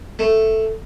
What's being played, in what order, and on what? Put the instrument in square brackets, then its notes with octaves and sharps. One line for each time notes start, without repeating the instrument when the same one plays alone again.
[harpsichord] A3